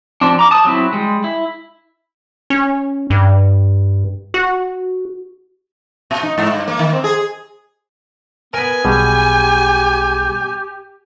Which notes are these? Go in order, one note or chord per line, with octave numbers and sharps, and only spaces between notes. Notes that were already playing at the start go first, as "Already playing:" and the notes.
F3 C4 D4
A#5 D6
A5 D#6
F#3 C4 E4
G3 G#3
E4
C#4
G2
F#4
A#2
D#4
G#2
G2
A#3
D#3
C4
G#4
B3 A#4 B4 G#5
B1 B2 G3 G4 G#4